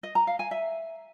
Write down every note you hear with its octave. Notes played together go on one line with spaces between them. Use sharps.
D#5
A#5
F5
G#5
E5